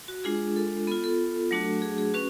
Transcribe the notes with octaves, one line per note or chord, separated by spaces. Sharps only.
F#4
G#3 D4 F4 G#4
A4
B3 F4 A4
A4
F#3 A3 D4 F#4
G#4
G#4
C#4 F#4 B4